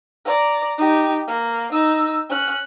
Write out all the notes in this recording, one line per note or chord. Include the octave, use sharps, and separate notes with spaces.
D5 A#5
D#4 G4
A#3
D#4 E6
C#4 F#6